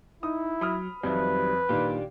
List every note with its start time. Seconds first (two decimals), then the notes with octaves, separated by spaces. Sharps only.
0.23 D#4 E4 D#6
0.61 F#3 B5 D#6 F6
1.03 F2 D#3 F#3 G3 B4 E5
1.69 A#2 D#3 D4 G4